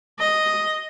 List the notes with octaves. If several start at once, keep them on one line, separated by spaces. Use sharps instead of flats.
D#5